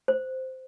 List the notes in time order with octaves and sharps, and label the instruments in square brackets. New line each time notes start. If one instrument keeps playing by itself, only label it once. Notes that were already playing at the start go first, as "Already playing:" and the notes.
[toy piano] C5